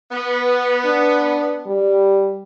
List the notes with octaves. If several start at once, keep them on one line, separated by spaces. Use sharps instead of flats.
B3
D4
G3